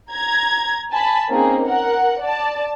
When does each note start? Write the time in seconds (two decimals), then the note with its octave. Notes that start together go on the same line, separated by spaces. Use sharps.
0.11 A#5 G#6
0.91 G#5 A5 B5
1.29 A#3 C4 C#4 D#4 G#4
1.65 A#4 F#5
2.20 D5 A5